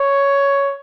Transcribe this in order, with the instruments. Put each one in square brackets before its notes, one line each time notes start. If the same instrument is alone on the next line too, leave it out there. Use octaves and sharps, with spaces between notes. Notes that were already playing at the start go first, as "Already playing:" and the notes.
Already playing: [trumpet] C#5